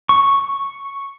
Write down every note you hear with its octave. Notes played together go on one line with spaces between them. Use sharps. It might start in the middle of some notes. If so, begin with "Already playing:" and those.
C#6